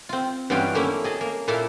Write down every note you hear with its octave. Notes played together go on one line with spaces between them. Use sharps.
C4 F4
G2 E3 F#3 C#4 F4 G5
A3 A#3 C#4 E4
G#4 D#5 A5
A#3
A#2 A#3 E4 A4 E5 F5